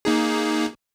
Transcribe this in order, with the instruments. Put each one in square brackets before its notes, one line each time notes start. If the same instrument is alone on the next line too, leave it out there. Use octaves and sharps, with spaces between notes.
[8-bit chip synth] A#3 D#4 G#4